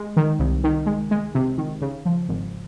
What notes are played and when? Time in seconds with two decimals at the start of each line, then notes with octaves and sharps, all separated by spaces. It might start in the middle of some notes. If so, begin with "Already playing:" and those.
Already playing: G#3
0.17 D#3
0.39 C2
0.64 D#3
0.86 G#3
1.11 G#3
1.35 C3
1.58 D#3
1.82 C#3
2.05 F3
2.29 G#1